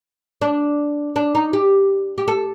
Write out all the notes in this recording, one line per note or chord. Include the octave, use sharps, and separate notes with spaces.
D4
D4
D#4
G4
G4
A4